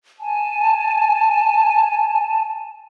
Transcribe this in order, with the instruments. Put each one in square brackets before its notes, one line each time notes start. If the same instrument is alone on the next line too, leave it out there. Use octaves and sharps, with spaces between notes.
[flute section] G#5 A5